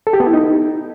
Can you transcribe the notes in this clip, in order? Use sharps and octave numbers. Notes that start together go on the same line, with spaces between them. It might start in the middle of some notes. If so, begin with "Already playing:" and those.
A4
G4
B3
E4
D#4